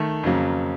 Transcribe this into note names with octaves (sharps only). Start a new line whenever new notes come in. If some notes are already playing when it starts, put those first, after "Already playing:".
Already playing: D#3 A3
F2 C#3 F#3 A#3